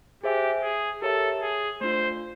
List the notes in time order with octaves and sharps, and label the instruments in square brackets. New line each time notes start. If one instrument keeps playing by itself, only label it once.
[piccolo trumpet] G4 [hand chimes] G#4 C5 E5 G#5
[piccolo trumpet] G#4
[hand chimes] G4 A#4 C#5 E5 A5 [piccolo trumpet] A4
[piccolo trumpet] G#4
[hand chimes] A3 D4 F4 [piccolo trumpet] C5